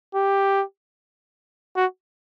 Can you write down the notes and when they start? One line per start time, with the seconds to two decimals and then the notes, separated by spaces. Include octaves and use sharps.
0.15 G4
1.76 F#4